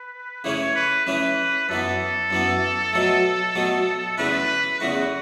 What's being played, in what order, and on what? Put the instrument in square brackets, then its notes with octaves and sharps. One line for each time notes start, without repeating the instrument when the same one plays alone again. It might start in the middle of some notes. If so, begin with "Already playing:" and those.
Already playing: [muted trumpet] B4
[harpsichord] C#3 E3 A3 C#4 [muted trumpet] C#5
[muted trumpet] B4
[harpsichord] C#3 E3 A3 C#4 [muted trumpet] B4
[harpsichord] F#2 E3 B3 [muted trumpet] A4
[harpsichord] F#2 E3 B3
B2 F#3 A3
B2 F#3 A3
[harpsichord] E2 C#3 A3 E4 [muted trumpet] B4
[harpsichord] E2 C#3 A3 E4 [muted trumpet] F#4